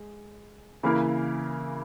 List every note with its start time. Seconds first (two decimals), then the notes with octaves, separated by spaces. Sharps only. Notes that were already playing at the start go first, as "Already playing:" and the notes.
Already playing: G#3
0.83 C#3 E3 A#3 E4 A#4